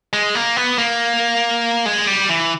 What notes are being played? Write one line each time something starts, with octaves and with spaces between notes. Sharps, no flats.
G#3
A#3
B3
A#3
G#3
G3
E3